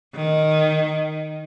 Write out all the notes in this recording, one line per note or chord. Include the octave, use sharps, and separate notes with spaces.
D#3